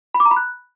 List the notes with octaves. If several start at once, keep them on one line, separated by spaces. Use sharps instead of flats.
B5
D6
A#5
B5
F#6